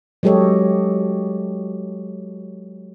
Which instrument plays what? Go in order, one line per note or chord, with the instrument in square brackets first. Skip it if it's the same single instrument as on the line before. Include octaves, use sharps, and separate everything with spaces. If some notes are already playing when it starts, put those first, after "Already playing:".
[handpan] F#3 G#3 G4 A4 C#5 D#5